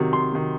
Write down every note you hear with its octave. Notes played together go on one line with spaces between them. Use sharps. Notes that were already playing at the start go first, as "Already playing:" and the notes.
Already playing: C3 D#3 F#3
C6
C3 D#3 F#3